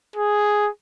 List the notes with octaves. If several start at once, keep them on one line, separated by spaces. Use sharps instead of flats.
G#4